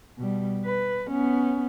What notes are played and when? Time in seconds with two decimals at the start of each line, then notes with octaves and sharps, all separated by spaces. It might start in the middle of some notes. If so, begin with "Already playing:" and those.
0.18 B2 G3
0.65 B4
1.10 B3 C#4